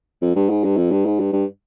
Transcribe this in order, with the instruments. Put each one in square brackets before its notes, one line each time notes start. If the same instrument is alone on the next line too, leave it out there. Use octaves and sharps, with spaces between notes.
[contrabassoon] F2
G2
G#2
G2
F2
G2
G#2
G2
G2